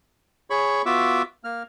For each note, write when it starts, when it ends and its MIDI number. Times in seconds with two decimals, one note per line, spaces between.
0.50 0.82 68
0.50 0.82 73
0.50 0.82 83
0.50 0.82 85
0.86 1.22 59
0.86 1.22 65
0.86 1.22 66
0.86 1.22 76
0.86 1.22 86
0.86 1.22 88
1.44 1.63 58
1.44 1.63 89